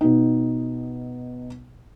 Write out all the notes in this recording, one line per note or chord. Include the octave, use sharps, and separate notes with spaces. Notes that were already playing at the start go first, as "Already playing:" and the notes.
B2 D#4